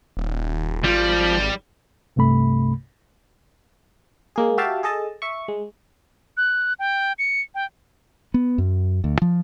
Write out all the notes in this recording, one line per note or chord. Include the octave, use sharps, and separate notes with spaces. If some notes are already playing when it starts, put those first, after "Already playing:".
D#1
G#1 F3 G3 F4
C2 G2 C3 A3 B5
G#3 A#3 G#4
F#4 G4 E5 F5 G5 A5
G#4 A4 D#5 A5
E5 C#6
G#3
F#6
G5
C#7
G5
B3
F#2
D2
F3